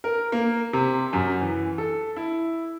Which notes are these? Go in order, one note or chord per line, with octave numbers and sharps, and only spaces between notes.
A#4
A#3
C3
F#2
E3
A4
E4